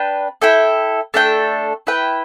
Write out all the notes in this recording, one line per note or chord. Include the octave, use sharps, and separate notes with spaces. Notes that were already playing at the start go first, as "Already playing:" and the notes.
Already playing: D4 B4 G5
E4 A4 G5
A3 D4 A4 G5
E4 B4 G5